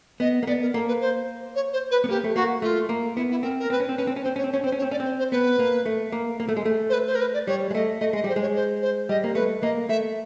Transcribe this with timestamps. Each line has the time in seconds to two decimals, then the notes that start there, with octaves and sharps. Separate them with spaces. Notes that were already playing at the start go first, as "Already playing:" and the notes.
0.20 B3 D#5
0.43 A#3
0.47 B3 D5
0.61 A#4
0.74 A#3 A4
0.88 B4
1.01 C5
1.55 C#5
1.73 C5
1.91 B4
2.04 B3
2.09 A#3 G4
2.24 A3
2.35 A#3 F#4
2.62 A3 F4
2.89 A#3
3.17 B3 E4
3.31 E4
3.43 C4 A#4
3.60 A#4
3.70 C4 B4
3.80 C#4
3.89 C4
3.97 C#4 B4
4.07 C4
4.16 C#4
4.24 C4 C5
4.36 C#4 C#5
4.44 C4
4.51 C#4 C#5
4.64 C4 C5
4.72 C#4
4.78 C#5
4.82 C4
4.91 C#4 D5
5.00 C4 C5
5.19 C5
5.32 B3 B4
5.59 A#3
5.86 A3
6.12 A#3
6.40 A#3
6.49 A3
6.57 G#3
6.65 A3
6.89 C5
6.93 B4
7.07 C5
7.15 A#4
7.21 B4
7.34 D5
7.47 G3 C#5
7.71 G#3
7.75 A3 D#5
8.00 A3 D#5
8.13 G#3 D#5
8.24 G3 C5
8.36 G#3
8.41 C#5
8.55 C5
8.82 C5
9.09 G3 D#5
9.24 A#3
9.35 A3 B4
9.62 A#3 D#5
9.89 A3 E5